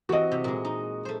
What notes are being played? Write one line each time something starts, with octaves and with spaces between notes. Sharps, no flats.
E3 C4 F#4 D#5
C3
A#2 G#3
D#4
A3 C5